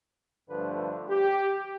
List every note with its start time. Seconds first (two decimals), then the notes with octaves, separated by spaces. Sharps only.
0.49 G2 D3 F3 A3 B4
1.09 G4